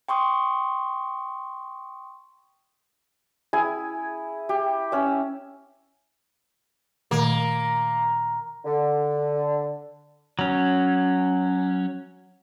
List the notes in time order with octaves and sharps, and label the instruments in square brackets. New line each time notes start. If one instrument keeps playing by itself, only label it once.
[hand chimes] G5 C6 C#6 D#6
[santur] E4 G#4 G#5
G4
C#4 E5
[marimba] A#2 D#3 A3 [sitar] A#3
[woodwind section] D3
[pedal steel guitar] F#3 C#4